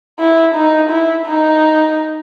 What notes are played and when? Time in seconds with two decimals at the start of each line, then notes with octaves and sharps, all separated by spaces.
0.20 E4
0.55 D#4
0.90 E4
1.26 D#4